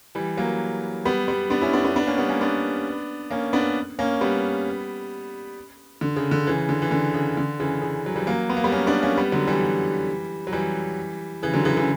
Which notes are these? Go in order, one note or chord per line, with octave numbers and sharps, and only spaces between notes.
E3 G3
F#3 A#3
G3 B3
G3 B3
B3 D4
C#4 E4
B3 D4
B3 D4
B3 D4
A#3 C#4
G3 B3
A#3 C#4
B3 D4
A#3 C#4
B3 D4
A#3 C#4
G3 B3
D3
C#3
D3
C#3 E3
D3
E3
D3
C#3
D3
C#3 E3
C#3
F#3
E3 G3
F#3 A#3
B3
A#3
G3 B3
A#3 C#4
B3 D4
A#3 C#4
G3 B3
D3 F#3
E3 G3
F#3
E3 G3
C#3 E3
D3 F#3
C#3 E3
C#3 E3